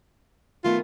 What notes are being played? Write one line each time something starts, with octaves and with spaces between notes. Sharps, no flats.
D#3 A3 B3 F4